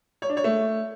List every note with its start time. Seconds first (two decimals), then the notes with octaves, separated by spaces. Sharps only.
0.22 C#5
0.29 D4
0.37 C#5
0.44 A3